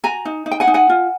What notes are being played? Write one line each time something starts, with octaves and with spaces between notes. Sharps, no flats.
F#4 G#5 A#5
D#4
D#4
G5
F#5 G#5
D#4
F#5 G#5
F4